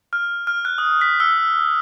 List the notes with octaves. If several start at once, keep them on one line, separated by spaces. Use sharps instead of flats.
F6
F6
F#6
D#6
B6
E6